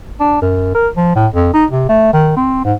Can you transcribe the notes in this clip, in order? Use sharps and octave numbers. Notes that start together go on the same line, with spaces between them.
D4
F#2
A#4
F3
A2
F2
D#4
C3
A3
D#3
C4
G#2